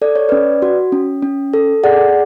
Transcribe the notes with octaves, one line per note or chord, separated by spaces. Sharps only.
A4 D5
C#5
C#4 B4 D5
F#4
C#4
C#4
A4
G#4 D5 F#5